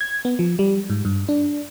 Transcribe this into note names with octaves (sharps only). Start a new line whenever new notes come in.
G#6
B3
F3
G3
G#2
G2
D4